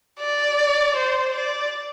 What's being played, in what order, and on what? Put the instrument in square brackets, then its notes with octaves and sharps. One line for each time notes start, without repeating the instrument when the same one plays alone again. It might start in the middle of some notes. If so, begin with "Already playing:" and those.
[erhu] D5
C5
D5